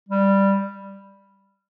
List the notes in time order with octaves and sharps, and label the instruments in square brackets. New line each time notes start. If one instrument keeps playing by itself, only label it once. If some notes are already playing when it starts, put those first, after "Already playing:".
[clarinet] G3